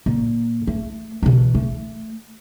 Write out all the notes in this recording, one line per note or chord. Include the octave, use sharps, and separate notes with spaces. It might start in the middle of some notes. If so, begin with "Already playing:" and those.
A#2
A3
B2 E3
A3